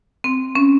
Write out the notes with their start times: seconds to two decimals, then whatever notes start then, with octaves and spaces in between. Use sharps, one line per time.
0.24 C4
0.55 C#4